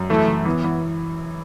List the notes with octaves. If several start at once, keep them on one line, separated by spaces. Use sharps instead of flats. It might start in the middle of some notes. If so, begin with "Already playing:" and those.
Already playing: F#2
E3 A3
E3
E3 B3
E3